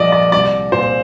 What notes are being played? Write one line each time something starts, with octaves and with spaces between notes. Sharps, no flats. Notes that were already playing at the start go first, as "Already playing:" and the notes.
Already playing: A#1 A#2 D5 D#5
D5
C2 D5
A#2 C5